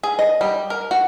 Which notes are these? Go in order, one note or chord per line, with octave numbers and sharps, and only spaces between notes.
G#4
D#5
G3
A#4
F#4